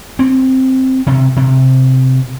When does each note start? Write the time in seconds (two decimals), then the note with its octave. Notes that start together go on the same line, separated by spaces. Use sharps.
0.19 C4
1.07 C3
1.36 C3